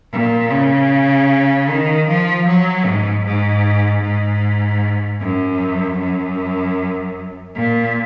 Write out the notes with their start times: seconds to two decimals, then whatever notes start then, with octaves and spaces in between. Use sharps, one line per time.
0.12 A#2
0.51 C#3
1.69 D#3
2.08 F3
2.47 F#3
2.86 G#2
3.25 G#2
4.03 G#2
5.20 F#2
5.99 F#2
7.55 A#2